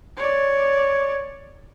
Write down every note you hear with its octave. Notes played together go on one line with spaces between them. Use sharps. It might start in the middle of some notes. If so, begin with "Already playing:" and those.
C#5 D5